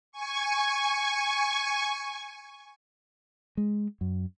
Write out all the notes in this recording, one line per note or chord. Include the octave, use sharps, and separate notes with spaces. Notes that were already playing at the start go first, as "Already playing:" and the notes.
G#5 C#6
G#3
F#2